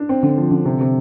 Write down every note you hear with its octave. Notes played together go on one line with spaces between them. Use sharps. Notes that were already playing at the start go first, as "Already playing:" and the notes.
Already playing: D4
C4
D3
F3
D3
C3
C3